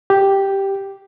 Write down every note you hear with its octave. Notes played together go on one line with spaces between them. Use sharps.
G4